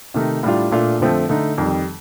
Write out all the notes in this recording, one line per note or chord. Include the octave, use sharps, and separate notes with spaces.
C3 D#3 A3 D#4
A2 G3 D4 F4
A#2 A3 D4 F4
F2 D3 F3 A3 C4
D3 A3 D#4
F2 D#3 G3